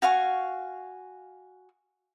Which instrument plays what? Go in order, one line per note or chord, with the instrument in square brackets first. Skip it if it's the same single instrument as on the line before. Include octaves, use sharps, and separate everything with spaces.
[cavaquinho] F#4 F5 G#5 C#6